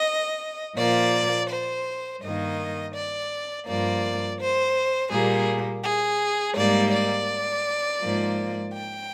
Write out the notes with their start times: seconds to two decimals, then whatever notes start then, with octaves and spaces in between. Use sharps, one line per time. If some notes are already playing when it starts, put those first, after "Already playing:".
Already playing: D#5
0.76 A#2 F3 A#3 D5
1.49 C5
2.21 G2 D#3 A#3 D#5
2.94 D5
3.66 G2 F3 A#3 D5
4.39 C5
5.10 A#2 G3 A#3 G#4
5.83 G#4
6.55 G#2 G3 A#3 D5
6.91 D5
8.00 G#2 F3 A#3
8.73 G5